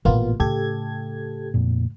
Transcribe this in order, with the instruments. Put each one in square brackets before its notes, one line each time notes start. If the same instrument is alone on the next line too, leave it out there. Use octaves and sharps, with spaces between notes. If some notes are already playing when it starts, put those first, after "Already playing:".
[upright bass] A1 A#2 [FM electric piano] A#3 B3 F4
[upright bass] A2 C#3 [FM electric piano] G4 A4 G#6
[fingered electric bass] F2 A#2